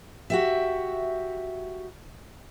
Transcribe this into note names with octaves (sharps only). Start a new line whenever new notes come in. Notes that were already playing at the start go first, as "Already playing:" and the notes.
F#4 G4 E5